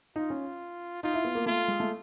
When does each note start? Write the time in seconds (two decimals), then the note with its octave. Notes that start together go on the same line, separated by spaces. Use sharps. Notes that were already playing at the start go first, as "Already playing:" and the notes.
0.16 D#4 F4
0.30 C#4
1.03 D#4 F4
1.14 E4
1.25 B3
1.35 A#3
1.46 A3 F4
1.68 G#3
1.80 A3